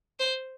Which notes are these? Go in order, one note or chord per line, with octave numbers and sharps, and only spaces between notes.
C5